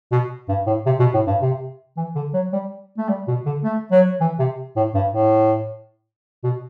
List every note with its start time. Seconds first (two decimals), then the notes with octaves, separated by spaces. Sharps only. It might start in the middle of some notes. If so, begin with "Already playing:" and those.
0.12 B2
0.49 G2
0.67 A2
0.86 C3
1.00 B2
1.14 A2
1.27 G2
1.42 C3
1.97 E3
2.15 D3
2.34 F#3
2.53 G3
2.98 A3
3.09 G3
3.28 B2
3.46 D3
3.64 A3
3.92 F#3
4.21 E3
4.39 C3
4.76 A2
4.95 G2
5.14 A2
6.44 B2